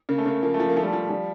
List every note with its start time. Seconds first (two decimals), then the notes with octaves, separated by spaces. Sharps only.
0.09 C#3 A#3
0.18 A3
0.26 C#3 A#3
0.43 F3 A#3
0.54 A3
0.60 F3
0.69 A#3
0.77 F3 A3
0.83 G3
0.88 A3
0.93 F3
1.10 F3 G3